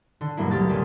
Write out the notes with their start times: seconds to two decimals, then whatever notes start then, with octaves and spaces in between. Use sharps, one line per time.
0.21 D3
0.37 G2 B2 F#3 A#3 E4
0.51 D2 F#3 G4 F6 A6
0.68 A#2 C#3 C#4 D4 G4